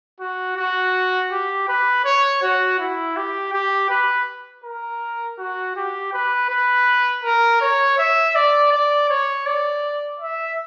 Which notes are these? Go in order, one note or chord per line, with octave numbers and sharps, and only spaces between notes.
F#4
F#4
G4
B4
C#5
F#4
E4
G4
G4
B4
A#4
F#4
G4
B4
B4
A#4
C#5
E5
D5
D5
C#5
D5
E5